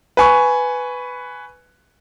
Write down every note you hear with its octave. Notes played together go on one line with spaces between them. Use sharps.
B4 G#5 C#6